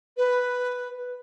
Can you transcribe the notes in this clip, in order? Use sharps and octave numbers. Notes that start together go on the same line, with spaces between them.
B4